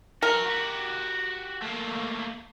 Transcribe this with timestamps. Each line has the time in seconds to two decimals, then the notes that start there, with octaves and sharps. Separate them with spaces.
0.22 F#4 A#4 C#5
0.46 F#4 G4
1.62 A3 A#3